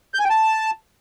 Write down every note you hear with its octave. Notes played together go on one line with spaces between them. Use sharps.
G6
G#5
G5
A5